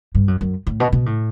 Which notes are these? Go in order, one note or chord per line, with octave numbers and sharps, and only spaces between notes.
G2
F#2
F#2
A2
B2
B2
A2